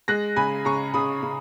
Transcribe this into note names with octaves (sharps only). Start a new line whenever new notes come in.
G#3 F#6 A#6
C#3 G#5 B5
C#3 A#5 C#6
C#3 B5 D#6
C#3